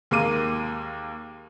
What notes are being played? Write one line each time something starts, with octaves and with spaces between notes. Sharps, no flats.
D#2 G#3 A#3 A#4 D6 D#7